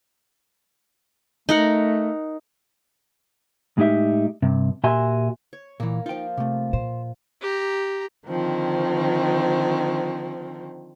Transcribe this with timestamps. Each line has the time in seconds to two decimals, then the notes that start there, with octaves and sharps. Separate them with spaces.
1.49 A3 D#4 A#4 F#5
3.78 A2 G#3 D#4 G4 E5
4.42 G2 C3
4.84 A#2 F#4 G4 E5 G#5 C6
5.53 C#5
5.80 A#2 E3 A#3
6.06 F3 D#4 F4 G5
6.37 C3 A3
6.73 A#2 C5
7.41 G4 A#5
8.27 D3 D#3 F3 C4